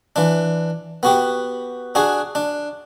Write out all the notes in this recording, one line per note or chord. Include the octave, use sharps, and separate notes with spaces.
E3 D4
B3 F#4 G4
D4 F#4 G#4
D4